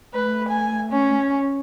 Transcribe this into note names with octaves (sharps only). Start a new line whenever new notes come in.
A3 B4
G#5
C#4